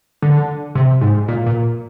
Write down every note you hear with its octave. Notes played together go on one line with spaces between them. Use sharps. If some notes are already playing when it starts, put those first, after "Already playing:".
D3
C3
G#2
A#2
A#2